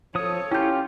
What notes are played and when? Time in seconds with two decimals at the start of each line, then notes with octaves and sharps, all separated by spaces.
0.15 F3 A4 C#5 D#6
0.52 C#4 E4 F4 G4 G6